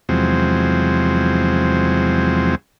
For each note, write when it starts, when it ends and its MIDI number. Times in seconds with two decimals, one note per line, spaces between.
0.09 2.55 40
0.09 2.55 48
0.09 2.55 53
0.09 2.55 54
0.09 2.55 56
0.09 2.55 60